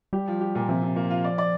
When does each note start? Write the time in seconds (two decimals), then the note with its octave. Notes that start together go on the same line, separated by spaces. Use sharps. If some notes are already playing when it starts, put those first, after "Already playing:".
0.13 G3 G4
0.28 F3
0.41 G4
0.55 A#2
0.68 C3 F3
0.83 C3
0.96 A#3
1.10 F4
1.24 D5
1.38 D5